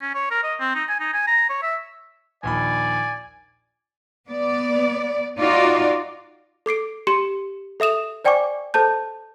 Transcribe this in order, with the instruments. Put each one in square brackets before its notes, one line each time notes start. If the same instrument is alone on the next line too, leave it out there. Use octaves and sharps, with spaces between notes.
[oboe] C#4
C#5
A#4
D#5
C4
D#4
G#5
D#4
G#5
A#5
C#5
E5
[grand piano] A#1 D#2 B5 [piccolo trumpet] D5 [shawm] G#5
[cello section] B3 D5
D#4 F4 F#4 D5
[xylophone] A4 D6 C7 D7
G4 C6 C#7 E7
A4 E5 D#6 E7 F7
C5 D5 G5 G#5 C#6 D6
A4 C5 A5 G6